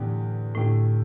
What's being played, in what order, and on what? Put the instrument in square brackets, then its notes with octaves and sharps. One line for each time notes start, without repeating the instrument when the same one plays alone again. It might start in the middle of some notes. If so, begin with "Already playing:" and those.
Already playing: [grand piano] E2 D3 A3 G4 [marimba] A2
[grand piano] D2 D3 A3 E4 G4 [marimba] A2